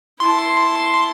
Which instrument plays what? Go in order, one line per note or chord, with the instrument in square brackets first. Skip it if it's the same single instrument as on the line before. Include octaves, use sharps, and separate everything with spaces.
[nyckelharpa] E4 A5 [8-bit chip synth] C6